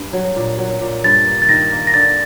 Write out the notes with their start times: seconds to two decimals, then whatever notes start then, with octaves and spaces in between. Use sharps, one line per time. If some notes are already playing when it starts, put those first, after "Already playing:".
Already playing: G2
0.13 F#3
0.36 A#2
0.58 F#3
0.81 A#2
1.04 G2 A6
1.27 A#3
1.42 A6
1.49 D#3 A#6
1.72 A#3
1.87 A#6
1.94 D3 A6